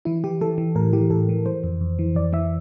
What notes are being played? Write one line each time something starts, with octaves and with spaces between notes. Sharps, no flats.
E3 E4
E3 G4
E3 A4
E3
A2 A#4
E3 G4
A2 A4
E3
E3 C5
F2
F2
E3
F2 D5
E3 E5